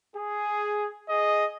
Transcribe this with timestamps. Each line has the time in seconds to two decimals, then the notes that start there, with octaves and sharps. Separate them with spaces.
0.16 G#4
1.08 G#4 D#5